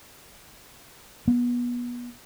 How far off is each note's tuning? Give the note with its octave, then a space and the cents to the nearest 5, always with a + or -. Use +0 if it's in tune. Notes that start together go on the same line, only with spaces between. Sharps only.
B3 -25